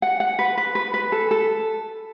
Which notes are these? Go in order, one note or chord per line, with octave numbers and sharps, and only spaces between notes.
F#5
F#5
B4
B4
B4
B4
A4
A4